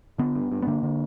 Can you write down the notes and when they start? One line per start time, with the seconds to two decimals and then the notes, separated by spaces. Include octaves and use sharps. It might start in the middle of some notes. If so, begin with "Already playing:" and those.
0.18 D3 B3
0.35 G2
0.52 G2
0.63 B3
0.67 D3 A#3
0.83 D3